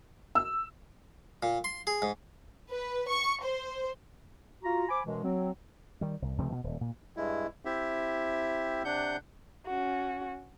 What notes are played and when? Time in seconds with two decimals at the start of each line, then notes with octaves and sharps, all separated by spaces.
0.35 E6
1.43 A#2
1.64 C6
1.87 G#4
2.02 G#2
2.72 B4
3.08 C#6
3.44 C5
4.63 F4 F#4 A#5
4.89 C5 G#5 B5 D6
5.05 F#2 B2 E3 G#3
5.23 F#3 C4
6.01 D#3 G3
6.22 C2
6.38 C#2 C3 F3 A3
6.52 B2
6.64 D#1
6.81 A#2
7.17 G2 G#3 E4
7.65 C4 E4 G4 E5
8.85 C3 D4 F#5 G6
9.67 C#4 F#4